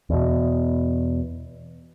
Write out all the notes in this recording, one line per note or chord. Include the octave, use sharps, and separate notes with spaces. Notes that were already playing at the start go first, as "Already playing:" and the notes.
E2 B2